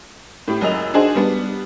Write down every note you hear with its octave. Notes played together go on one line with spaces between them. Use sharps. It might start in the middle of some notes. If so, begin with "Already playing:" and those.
A2 G4
F#1 F#2 D#5 F7
D4 D#4 F#4 G#4 C5
G3 B3 D4